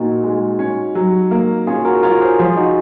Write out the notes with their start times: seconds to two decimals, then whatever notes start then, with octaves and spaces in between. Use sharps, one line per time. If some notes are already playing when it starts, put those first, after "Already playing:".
Already playing: A#2 D#4 F#4
0.24 G#3
0.59 C#4
0.95 F#3
1.31 A#3
1.67 C#4 F4 G#4
1.85 F#4 A#4
2.03 F4 A#4 C#5
2.21 G#4 C5
2.39 F3 F4 G#4
2.57 D#4 F#4